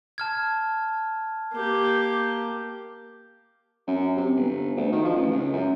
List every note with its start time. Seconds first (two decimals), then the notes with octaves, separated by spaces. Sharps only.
0.18 A5 F6 G#6
1.53 A#3 G4
3.88 F#2
4.17 C3
4.36 G1
4.77 D2
4.92 D#3
5.04 F3
5.16 A1
5.32 C#2
5.53 F#2